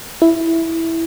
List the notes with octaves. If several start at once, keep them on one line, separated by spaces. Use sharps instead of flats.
E4